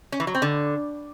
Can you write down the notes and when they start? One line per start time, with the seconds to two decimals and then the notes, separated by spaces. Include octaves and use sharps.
0.12 C#4
0.20 E3
0.27 F#3
0.35 C4
0.42 D3